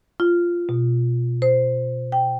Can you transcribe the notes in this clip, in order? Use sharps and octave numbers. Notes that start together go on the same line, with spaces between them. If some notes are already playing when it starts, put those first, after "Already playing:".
F4
B2
C5
G5